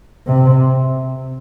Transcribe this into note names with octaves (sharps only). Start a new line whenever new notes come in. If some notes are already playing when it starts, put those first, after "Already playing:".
C3